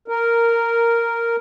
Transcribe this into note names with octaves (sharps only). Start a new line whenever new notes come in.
A#4